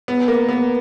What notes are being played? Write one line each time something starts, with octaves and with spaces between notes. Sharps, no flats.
B3
A#3
B3